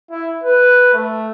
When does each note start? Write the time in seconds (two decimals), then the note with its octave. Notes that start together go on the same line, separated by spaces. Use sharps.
0.11 E4
0.44 B4
0.94 A3